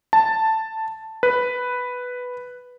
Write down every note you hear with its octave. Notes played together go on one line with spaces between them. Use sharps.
A5
B4